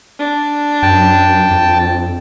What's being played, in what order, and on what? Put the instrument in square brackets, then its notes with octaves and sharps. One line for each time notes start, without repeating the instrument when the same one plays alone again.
[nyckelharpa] D4
[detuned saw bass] F#2 [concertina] G5 A5
[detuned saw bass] F2